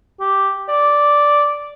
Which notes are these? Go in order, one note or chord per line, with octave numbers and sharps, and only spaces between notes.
G4
D5